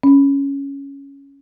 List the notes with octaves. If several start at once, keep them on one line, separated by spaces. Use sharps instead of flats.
C#4